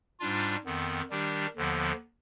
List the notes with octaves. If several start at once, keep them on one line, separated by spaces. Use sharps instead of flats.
G#2 G3 D4 F4
F2 D#3 B3
D#3 G3 D4 G4
D#2 D3 F3 B3